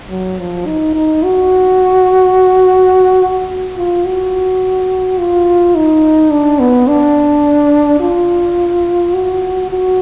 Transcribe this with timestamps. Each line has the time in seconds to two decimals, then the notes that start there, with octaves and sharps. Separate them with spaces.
0.10 F#3
0.39 F3
0.66 D#4
0.95 D#4
1.23 F#4
3.77 F4
4.05 F#4
5.19 F4
5.75 D#4
6.31 D4
6.60 B3
6.88 D4
8.00 F4
9.14 F#4
9.70 F#4